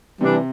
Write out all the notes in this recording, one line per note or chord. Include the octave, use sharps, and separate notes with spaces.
C3 E3 G3 D4